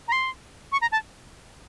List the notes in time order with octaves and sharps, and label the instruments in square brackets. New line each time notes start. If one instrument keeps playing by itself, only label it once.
[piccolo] A#5
C6
C#6
A#5
A5